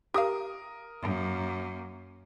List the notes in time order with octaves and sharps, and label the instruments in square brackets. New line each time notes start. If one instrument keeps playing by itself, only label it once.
[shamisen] G4 F5 [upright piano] A#4 D#6
[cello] F#2 A#3